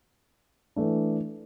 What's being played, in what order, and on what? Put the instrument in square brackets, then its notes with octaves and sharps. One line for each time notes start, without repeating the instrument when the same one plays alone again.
[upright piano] E3 A3 D4